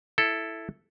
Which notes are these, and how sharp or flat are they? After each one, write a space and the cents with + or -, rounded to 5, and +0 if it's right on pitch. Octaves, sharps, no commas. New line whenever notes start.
E4 +0 A4 +0